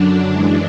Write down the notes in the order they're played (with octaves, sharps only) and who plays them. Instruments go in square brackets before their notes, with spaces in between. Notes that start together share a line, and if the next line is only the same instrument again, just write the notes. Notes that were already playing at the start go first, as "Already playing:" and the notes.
Already playing: [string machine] F#2 D3 F#3 D4
F#2 E3 G#3 D4